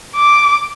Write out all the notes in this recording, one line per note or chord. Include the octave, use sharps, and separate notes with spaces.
D6